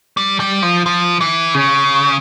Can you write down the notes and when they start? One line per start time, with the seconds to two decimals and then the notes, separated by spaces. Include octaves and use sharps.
0.17 G3
0.40 G3
0.62 F3
0.86 F3
1.21 E3
1.54 C#3